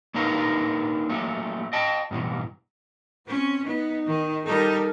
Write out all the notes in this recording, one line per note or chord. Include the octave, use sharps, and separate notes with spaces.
A#3 D4 D#4 F4 A#4 B4
F#3 A3 A#3
D#5 G5 A5
G2 B2 E3
C4 C#4
B3 D#4
D#3
G3 D#4 A4 A#4